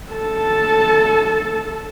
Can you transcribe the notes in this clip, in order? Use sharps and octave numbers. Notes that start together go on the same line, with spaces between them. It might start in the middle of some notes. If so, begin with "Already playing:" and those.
A4 A5